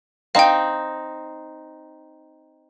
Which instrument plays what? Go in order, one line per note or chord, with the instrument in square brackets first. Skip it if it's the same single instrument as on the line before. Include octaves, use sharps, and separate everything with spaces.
[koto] C4 D#4 [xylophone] F5 G5